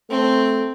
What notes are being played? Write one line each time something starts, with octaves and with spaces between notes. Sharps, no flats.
A3 C4